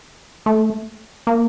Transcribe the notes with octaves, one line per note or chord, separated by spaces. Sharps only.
A3
A#3